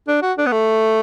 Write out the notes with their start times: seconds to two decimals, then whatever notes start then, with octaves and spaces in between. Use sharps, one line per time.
0.08 D4
0.22 F#4
0.38 D4
0.47 B3
0.52 A3